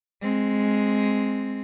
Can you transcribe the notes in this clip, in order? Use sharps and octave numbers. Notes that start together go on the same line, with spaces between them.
G#3 C4